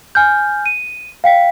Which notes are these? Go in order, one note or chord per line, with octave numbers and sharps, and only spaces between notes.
G#5 F6 G6
D#7
F5 G5 B6